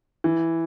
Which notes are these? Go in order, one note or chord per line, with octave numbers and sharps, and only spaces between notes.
E3